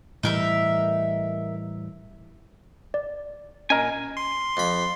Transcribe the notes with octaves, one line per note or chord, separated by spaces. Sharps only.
A2 E3 G3 D#4 A#4 E5
D5
A#2 C#4 A#4 D#5 G#5 A#5
C6
F2 B5